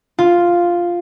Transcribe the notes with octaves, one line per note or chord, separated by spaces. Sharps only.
F4